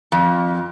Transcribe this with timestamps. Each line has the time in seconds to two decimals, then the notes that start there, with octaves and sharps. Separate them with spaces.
0.12 F2